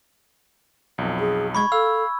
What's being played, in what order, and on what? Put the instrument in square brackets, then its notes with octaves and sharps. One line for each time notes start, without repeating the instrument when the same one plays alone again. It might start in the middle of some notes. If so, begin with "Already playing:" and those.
[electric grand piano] B1 F2
[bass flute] G#4
[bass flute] G#3 [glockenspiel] B5 C#6 G#6
[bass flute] A4 [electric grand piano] F5 [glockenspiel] E6